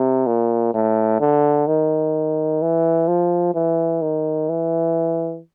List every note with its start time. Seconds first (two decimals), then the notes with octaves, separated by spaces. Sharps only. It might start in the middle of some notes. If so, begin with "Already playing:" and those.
Already playing: C3
0.27 A#2
0.74 A2
1.20 D3
1.67 D#3
2.62 E3
3.08 F3
3.55 E3
4.02 D#3
4.49 E3